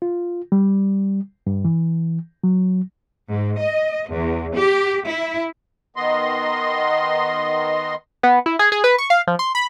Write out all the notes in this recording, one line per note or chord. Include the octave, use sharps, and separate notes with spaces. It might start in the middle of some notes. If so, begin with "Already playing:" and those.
F4
G3
G2
E3
F#3
G#2
D#5
E2
G4
E4
D#3 B3 D#5 C6
B3
E4
G#4
G#4
B4
C#6
F5
F3
C6
B5